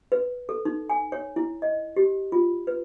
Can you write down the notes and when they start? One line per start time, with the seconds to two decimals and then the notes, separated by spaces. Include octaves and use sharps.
0.12 B4
0.49 A4
0.65 D#4
0.90 G#5
1.12 C#5
1.36 E4
1.62 D#5
1.96 G4
2.32 F4
2.67 B4